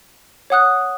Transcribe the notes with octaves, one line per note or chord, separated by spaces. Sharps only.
C#5 F#5 D#6 F#6